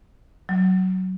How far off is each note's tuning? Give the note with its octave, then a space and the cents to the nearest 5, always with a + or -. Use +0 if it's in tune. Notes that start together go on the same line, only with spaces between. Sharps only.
F#3 +10